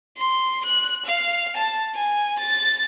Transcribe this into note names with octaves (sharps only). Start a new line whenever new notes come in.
C6
F#6
F5
A5
G#5
A6